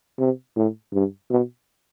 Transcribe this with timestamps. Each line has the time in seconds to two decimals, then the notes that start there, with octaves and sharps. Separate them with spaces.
0.19 C3
0.56 A2
0.93 G2
1.30 B2